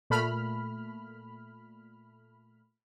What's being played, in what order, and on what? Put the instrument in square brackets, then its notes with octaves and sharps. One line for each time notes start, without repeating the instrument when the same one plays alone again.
[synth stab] A#2 A3 B5 F6